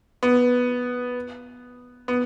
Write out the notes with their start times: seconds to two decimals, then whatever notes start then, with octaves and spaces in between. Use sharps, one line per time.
0.23 B3
2.08 B3